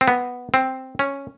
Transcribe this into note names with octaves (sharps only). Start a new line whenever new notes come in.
C4
B3
C4
C#4